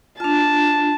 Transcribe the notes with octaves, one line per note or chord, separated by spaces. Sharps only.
D4 F4 A5